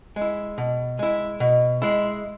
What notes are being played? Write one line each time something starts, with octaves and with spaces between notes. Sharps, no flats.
G#3
E4
B2
G#3 E4
B2
G#3 E4